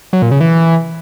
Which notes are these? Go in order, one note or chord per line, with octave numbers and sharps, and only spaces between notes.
F#3
A#2
C#3
E3